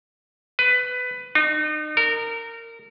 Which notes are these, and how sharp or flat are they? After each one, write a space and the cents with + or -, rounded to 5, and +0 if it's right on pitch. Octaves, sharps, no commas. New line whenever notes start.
B4 +15
D#4 -35
A#4 -20